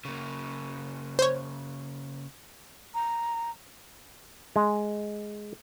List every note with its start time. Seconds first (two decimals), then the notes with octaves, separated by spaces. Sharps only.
0.05 C#3 A#3
1.19 C5 C#5
2.94 A#5
4.56 G#3